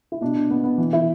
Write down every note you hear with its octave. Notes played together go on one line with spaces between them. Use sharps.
E4
B2 D4
D4
B2 B3
B3
E3
E4